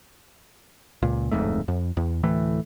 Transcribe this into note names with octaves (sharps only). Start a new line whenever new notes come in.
C#2 A#2
D1 F2 G#2 A3
F2
E2
D2 A2 E3 A3